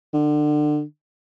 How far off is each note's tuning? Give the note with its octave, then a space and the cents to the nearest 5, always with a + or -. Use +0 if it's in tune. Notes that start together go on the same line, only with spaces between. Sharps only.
D3 +30